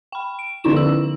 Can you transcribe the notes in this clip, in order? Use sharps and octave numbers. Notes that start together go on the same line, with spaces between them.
G5 B5
D7
D3 F3 C#4 D#4 E4 E7
E6 F#7